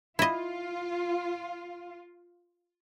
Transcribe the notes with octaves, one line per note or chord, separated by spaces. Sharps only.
E4 F4 D#5